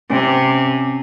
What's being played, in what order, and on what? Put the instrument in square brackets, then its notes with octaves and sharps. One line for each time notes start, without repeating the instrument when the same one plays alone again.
[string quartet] C3 [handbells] C#4